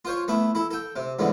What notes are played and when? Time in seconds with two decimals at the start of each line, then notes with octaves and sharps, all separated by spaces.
0.05 F4 C5 C#5
0.28 A3 B3 E4
0.55 E4 A4
0.71 A4 G5
0.96 C3
1.19 E2 G#2 D3 B3